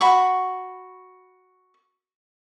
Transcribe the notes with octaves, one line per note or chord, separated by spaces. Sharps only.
F#4 B5 C#6